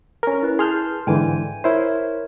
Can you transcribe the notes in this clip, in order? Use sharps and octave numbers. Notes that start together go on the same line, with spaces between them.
C#4 A#4
E4 B4
G#4 A5 C6 F6 G6
G#2 D3 E3 G5 G#5
E4 A#4 C5 C#5 E5